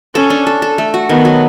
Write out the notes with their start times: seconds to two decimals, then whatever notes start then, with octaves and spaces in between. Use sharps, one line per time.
0.15 C#4 A4
0.30 D4
0.47 A4
0.62 A4
0.78 A3
0.94 F#4
1.09 D#3 B3
1.25 F#3